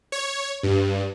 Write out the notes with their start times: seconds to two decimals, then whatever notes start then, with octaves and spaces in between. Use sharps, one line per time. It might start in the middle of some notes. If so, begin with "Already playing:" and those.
0.12 C#5
0.63 G2